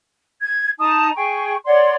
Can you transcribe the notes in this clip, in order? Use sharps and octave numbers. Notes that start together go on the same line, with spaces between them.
G#6
D#4 A5 A#5 D#6
G#4 G5 C#6
C#5 D5 F#5 C6